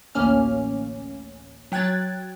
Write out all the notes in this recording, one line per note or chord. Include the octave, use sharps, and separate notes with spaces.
A1 D2 A#3 C#4 F6
F#3 G5 F#6 G#6 A6